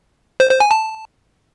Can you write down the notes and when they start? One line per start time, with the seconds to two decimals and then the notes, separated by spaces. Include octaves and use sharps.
0.40 C5
0.50 C5
0.60 G#5
0.71 A5